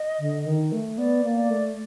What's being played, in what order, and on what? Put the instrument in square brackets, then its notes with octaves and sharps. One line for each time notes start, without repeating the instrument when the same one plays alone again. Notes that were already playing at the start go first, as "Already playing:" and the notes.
Already playing: [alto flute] D#5
[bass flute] D3
D#3
A3
[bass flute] B3 [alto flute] D5
[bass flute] A#3
[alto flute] D5
[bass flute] A3